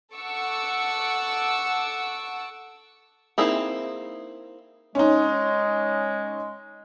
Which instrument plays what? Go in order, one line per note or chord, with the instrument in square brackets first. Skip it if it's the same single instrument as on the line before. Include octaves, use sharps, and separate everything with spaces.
[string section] A4 F#5 C#6 D6 E6
[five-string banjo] A#3 C4 D#4 E4 G#4
[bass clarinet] G#3 [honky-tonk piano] C#4 D#4